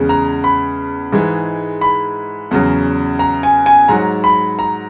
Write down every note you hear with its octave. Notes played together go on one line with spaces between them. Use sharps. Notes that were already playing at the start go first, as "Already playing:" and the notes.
Already playing: E2 C#3 G#3
A#5
B5
G#2 E3 G#3
B5
E2 C#3 F#3
A#5
G#5
G#5
G#2 F#3 A#5
B5
A#5